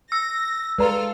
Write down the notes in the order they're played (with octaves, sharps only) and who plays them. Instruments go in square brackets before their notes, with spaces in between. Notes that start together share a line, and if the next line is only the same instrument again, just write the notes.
[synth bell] E6 [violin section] A#6
[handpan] G#3 [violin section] F4 A4 F6 [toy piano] B4 D5 A#5